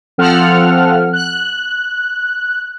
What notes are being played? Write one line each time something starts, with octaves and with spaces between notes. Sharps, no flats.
F3 C4 A4 F#5 F6
F#6